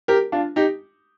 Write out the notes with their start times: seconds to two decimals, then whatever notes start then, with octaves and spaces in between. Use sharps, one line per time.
0.08 G4 A#4
0.32 D4 F4
0.56 D#4 G4